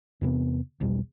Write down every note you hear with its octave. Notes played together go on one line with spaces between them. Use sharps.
E2 C3 B3
B1 E2 B2 G3